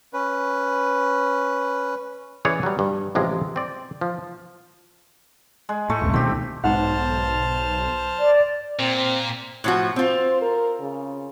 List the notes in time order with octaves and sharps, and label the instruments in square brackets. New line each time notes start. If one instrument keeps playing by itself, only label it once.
[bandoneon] C#4 B4
[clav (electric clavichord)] E3 C#4 G#4 C#5 D5
F#3 G3
G2
A1 C3 F3 G#3
C4 D5
F3
[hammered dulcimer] G#3
[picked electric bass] A2 [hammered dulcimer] A3 C#6
[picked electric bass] E1 C2
[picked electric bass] C#2 B2 D#3 [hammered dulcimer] C4 G4
[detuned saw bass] B1 [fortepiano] G#2 F#5 [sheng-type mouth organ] C5 A5 F6
[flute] D5
[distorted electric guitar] A#2 [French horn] C4
[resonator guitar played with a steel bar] A2 F3 F#4
[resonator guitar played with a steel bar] C4 F4 [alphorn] C5
[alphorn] A#4
C#3